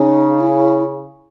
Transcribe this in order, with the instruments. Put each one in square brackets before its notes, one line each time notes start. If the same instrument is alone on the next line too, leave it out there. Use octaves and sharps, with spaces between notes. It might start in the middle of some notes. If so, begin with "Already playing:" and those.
Already playing: [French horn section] C#3 [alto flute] D#4
[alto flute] E4